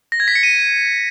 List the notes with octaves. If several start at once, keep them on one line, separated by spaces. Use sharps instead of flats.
A#6
G#6
B6
C#7
D#7